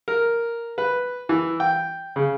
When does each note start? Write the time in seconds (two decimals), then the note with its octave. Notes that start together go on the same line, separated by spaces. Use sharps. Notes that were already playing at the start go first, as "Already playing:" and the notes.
0.08 A#4
0.78 B4
1.29 E3
1.60 G5
2.16 C#3